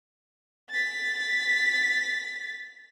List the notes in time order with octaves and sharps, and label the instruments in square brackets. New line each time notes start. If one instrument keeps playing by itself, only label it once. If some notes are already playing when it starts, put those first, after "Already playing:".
[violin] A6 B6